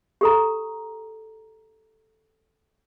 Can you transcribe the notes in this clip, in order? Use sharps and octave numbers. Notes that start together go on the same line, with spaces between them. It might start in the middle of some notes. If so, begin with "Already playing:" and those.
G4 A4 A#5